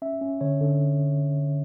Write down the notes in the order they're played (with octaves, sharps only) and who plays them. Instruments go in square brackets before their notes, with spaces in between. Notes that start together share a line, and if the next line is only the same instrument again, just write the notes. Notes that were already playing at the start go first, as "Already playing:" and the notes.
[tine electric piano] C#4 E5
C#4
D3 C#5
D3